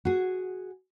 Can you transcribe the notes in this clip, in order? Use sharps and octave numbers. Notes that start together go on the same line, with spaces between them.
F#4 G#4